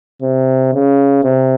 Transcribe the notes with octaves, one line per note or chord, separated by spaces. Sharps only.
C3
C#3
C3